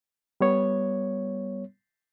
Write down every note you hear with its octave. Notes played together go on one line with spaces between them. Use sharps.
G3 B3 C#5